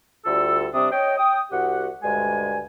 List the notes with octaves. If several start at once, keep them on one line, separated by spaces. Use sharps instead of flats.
D2 G3 F4 A4 E6
C3 G3 C4 D4 D#6
C#5 D#5 G5
G5 D#6
C2 F#4 G4 F#5
D2 G2 G#3 G#5